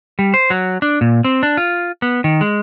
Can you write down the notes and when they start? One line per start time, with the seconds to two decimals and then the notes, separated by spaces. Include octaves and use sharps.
0.19 G3
0.34 C5
0.50 F#3
0.82 D4
1.01 A#2
1.24 C4
1.43 D4
1.57 F4
2.02 B3
2.24 D#3
2.41 G#3